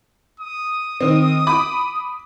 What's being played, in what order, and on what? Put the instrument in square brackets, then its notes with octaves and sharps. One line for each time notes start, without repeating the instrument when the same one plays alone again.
[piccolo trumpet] D#6
[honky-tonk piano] D#3 C4
B5 D6